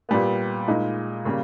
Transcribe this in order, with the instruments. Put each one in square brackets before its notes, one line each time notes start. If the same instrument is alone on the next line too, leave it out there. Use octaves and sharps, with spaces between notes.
[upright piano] A#2 G3 B3
A#2 G#3 D#4
C#3 G3 A#3